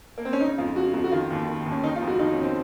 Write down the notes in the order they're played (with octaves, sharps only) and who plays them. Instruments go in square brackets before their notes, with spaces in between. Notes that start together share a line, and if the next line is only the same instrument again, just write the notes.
[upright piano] A#3
C4
C#4
C#3 D#4
F2 F4
C#3 F#4
F2 F#4
F#4
D#3 F4
D#2
D#3
D#2
C#4
D#3 D#4
F4
F2
F#4
D#3 D#4
C#4
F2
C4